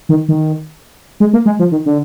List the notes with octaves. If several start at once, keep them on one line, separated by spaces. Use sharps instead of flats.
D#3
D#3
G#3
A#3
G#3
F3
D#3
D3